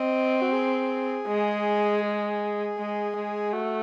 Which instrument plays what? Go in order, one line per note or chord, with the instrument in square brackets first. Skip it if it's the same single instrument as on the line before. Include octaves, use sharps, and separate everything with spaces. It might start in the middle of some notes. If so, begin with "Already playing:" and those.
Already playing: [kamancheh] C4 [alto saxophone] D#5
[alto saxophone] F#4
G#4
[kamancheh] G#3
[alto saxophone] G#4
[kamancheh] G#3
G#3
[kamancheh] A3 [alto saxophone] F#4